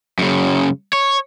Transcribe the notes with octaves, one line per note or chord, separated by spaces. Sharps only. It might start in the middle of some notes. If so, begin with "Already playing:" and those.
F#2 C#3
C#5